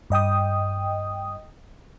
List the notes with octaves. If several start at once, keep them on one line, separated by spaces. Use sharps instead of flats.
G2 D#5 G5 D#6